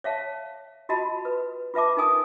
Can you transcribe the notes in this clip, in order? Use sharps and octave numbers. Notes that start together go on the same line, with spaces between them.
C#5 E5 F5 A5
F4 F#4 D#5 A5 B5
B4
F4 B4 E5 A5 D6
D#4 A#4 G#5 D#6